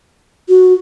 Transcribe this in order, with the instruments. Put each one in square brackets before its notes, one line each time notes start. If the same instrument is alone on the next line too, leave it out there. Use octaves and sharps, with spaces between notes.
[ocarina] F#4